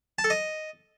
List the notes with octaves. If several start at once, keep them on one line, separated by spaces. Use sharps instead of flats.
A5
A4
D#5